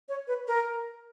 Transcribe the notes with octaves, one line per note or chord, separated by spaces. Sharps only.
C#5
B4
A#4